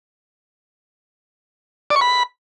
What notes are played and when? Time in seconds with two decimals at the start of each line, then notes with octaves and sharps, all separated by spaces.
1.90 D5
1.96 C#6
2.01 B5